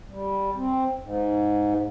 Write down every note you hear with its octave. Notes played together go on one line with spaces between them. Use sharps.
G3
C4
G#2